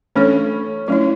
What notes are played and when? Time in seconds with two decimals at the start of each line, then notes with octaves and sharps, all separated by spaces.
0.16 E3 A3 C#4 D4 A4 C#5
0.88 F#3 A3 C#4 E4